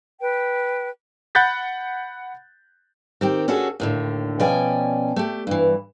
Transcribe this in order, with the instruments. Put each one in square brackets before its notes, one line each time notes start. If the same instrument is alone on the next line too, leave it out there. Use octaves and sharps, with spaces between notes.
[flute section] B4 G5
[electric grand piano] F#5 B5 F#6 G6 A6 B6
[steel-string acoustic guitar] D#3 C4 G4
C#4 D4 F#4 G#4 A4
D#2 A2 D3
B2 F3 C#4 D5 G5 G#5
A3 G4
G2 E3